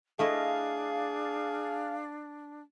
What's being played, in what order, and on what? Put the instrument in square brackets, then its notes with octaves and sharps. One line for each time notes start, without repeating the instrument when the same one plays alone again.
[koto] A3 E4 D#5 [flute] D4 [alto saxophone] G#4 [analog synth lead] F5